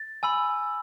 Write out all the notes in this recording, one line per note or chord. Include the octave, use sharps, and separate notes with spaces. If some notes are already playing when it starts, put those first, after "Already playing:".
Already playing: A6
G#5 B5 E6